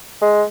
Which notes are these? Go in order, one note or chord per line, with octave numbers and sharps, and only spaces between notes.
G#3